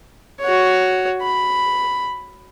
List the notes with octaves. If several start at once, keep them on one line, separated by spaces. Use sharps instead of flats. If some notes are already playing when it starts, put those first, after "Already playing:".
F#4 C#5
B5